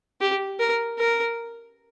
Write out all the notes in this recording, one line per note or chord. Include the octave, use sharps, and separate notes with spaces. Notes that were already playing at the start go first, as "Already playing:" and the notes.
G4
A#4
A#4